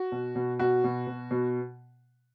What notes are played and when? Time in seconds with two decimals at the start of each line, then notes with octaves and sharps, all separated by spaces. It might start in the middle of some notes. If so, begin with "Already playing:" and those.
Already playing: F#4
0.12 B2
0.36 B2
0.59 B2 F#4
0.84 B2
1.07 B2
1.31 B2